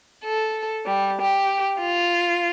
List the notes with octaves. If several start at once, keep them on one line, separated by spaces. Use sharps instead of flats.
A4
G3
G4
F4